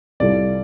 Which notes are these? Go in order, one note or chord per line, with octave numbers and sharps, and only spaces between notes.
C2 C3 G3 F4 A4 D5